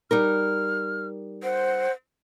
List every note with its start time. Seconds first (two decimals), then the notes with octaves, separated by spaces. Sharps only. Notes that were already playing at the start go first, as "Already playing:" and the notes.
0.11 G3 D#4 A#4 F6
1.43 C5 F#5